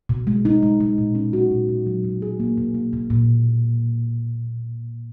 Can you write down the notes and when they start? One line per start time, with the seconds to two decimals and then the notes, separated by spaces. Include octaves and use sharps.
0.09 B2
0.27 G#3
0.45 D#4
0.62 G#3
0.80 G#3
0.98 A#2
1.15 C#4
1.33 F#4
1.51 A#2
1.69 A#2
1.87 F#3
2.04 B2
2.22 G#4
2.40 A#3
2.58 B2
2.74 A#3
2.93 B2
3.10 A#2